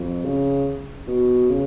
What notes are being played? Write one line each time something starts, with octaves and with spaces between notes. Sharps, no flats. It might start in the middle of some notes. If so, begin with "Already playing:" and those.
Already playing: F2
C#3
B2
C#3